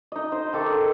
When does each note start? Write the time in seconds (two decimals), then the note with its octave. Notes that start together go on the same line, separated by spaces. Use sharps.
0.12 D#4 D#5
0.32 C5
0.53 D#3 A4 D6